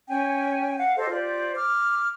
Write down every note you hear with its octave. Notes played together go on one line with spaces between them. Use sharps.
C#4 G5 G#5
F5 F#5
G4 A4 C5 D#5
F4 G4 C5 D5
D6 F6